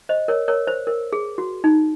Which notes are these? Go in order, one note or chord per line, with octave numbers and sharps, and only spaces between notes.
C5 D#5
A#4 C#5
A#4 C#5
C5
A#4
G#4
F#4
D#4